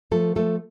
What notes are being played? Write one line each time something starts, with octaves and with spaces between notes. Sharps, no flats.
F3 A3 A4
F3 A3 A4